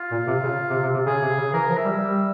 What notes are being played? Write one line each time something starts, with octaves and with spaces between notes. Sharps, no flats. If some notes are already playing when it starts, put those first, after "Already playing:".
Already playing: F4
A#2
C3
C#3
C3
C3
C3
C#3 G#4
C3
C#3
E3 A#4
F3
E5
G3
G3